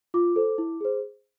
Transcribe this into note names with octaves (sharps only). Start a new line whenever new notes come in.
F4 D6
A4 C5
E4
G#4 C5